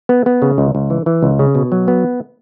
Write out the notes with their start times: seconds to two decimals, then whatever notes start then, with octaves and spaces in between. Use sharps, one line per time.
0.09 B3
0.26 B3
0.42 C#3
0.58 C#2
0.75 C#2
0.90 E3
1.06 E3
1.23 C#2
1.39 C#3
1.55 B2
1.72 F#3
1.88 B3